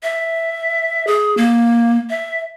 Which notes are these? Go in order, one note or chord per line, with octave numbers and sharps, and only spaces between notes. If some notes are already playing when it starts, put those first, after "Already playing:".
E5
G#4
A#3
E5